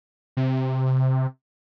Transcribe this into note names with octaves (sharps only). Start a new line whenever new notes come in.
C3